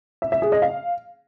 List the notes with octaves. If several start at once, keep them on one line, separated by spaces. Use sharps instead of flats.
E5
E5
G#4
D#5
F5